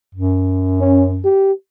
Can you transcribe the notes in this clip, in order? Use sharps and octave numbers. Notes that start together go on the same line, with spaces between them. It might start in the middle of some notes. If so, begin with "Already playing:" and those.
F#2
C#4
G4